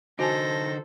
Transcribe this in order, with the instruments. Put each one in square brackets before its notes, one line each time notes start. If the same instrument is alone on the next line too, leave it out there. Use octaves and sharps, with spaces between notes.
[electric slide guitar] D3 D#4 [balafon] F#4 G#5 A5 [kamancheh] A4 C5 [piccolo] A#6